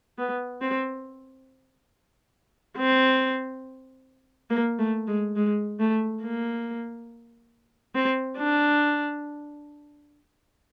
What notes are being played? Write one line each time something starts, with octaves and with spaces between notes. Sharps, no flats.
B3
C4
C4
A#3
A3
G#3
G#3
A3
A#3
C4
D4